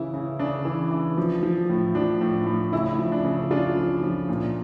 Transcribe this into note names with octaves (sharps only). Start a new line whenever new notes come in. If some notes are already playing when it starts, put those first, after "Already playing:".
Already playing: C#3 E3 E4
C#3
C#3 D4
E3
E3
F3
F3
A2
F3 D4
A2
A2
C#3 E4
F3
D4
C#3
C#3 D4 F4
F3
F3
A#2